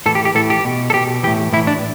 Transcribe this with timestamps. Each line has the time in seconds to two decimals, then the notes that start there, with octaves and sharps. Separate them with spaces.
0.06 A2 E3 A4
0.15 G4
0.25 G4
0.35 A2 E3 A4
0.50 G4
0.64 B2
0.90 A4
0.94 B2 G4
1.23 E3 G4
1.27 A2
1.53 A2 E4
1.57 E3
1.67 D4